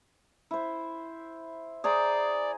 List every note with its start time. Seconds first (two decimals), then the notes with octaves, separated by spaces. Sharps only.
0.51 E4 C5
1.84 G#4 C5 D5 A#5